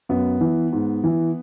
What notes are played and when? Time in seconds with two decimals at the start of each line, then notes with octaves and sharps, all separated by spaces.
0.09 F#2 B3
0.41 E3
0.73 G#2
1.04 E3